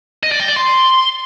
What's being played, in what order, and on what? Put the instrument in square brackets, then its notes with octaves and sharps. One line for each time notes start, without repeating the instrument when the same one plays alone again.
[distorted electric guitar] D#5
D5
G5
D5
C6